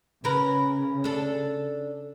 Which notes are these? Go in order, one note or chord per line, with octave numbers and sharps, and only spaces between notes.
C#3 C#4 A#4 B4
D4 A4